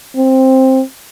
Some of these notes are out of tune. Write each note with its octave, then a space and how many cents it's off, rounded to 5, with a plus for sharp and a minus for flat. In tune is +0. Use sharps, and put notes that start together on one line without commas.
C4 +10